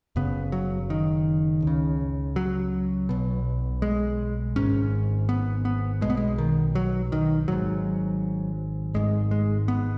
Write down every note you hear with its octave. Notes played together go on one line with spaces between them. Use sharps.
F#1 F#2 C#3 B3
F#3
D#3
C#2 C#3
F#3
B1 B2
G#3
G#1 G#2 C#4
B3
B3
B1 B2 G#3
B3
G#3
D#3
F#3
D#3
G#1 G#2 F#3
G#1 G#2 G#3
G#3
B3